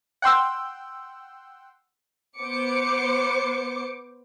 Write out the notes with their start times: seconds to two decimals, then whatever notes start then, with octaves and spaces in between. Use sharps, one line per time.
0.22 F#5 G5 C6 E6
2.38 B3 C5 D6 C#7